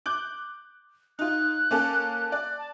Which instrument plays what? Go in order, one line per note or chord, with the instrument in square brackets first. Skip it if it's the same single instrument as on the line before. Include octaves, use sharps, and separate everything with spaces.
[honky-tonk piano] D6 F#6 G6
[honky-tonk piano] D#4 F4 [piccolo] F#6
[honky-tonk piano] A#3 C#4 A4
D5
[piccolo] A5